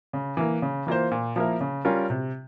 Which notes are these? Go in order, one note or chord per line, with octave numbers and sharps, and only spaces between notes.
C#3
E3 A#3
C#3
E3 A#3 F4 C5
A#2
F3 A#3 E4 A#4
C#3
G3 C#4 F4 A#4
C3